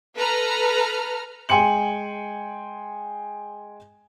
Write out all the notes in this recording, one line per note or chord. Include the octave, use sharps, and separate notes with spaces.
A4 B4 A#5 F6
G#3 G5 G#5 C6 C#7 F#7